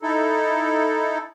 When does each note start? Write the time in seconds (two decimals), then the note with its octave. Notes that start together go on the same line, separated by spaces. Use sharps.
0.02 D#4 E4 A4